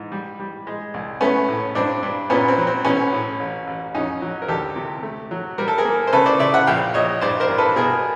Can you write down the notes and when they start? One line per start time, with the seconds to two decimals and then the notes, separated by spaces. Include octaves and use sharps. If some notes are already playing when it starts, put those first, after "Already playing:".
Already playing: G#2 E3
0.12 G3
0.40 G3
0.67 G#3
0.94 C2
1.21 A3 B3 C#4
1.48 A2
1.75 G2 C4 D4
2.03 G2
2.30 A#2 B3 C#4
2.48 C4
2.58 F#3
2.67 C4
2.85 B1 B3 C#4
3.12 A2
3.40 A1
3.67 A1
3.94 F2 C#4 D#4
4.22 F#3
4.42 A#4
4.48 D2 G4 A4
4.76 C3
5.03 A3
5.31 F#3
5.58 G3 A#4
5.68 A4
5.78 G#4 A#4
5.85 A#3
6.07 C5
6.13 C#3 A4 B4
6.26 C5 D5
6.39 C#3 D5 E5
6.54 E5 F#5
6.67 A#1 F5 G5
6.94 A#1 C#5 D#5
7.21 G2 C5 D5
7.40 A#4 C5
7.49 G2
7.58 A4 B4
7.76 B2 G#4 A#4